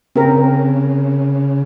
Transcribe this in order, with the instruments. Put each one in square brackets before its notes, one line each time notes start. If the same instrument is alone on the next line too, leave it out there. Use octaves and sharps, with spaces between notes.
[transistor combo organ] C#3 [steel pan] C4 A#4